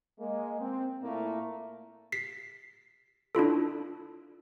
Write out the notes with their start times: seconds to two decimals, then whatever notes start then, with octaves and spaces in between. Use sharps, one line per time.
0.19 G#3 A#3
0.59 C4
1.01 A#2 A3 A#3 E4
2.12 B6 C7
3.35 D4 E4 F4 A4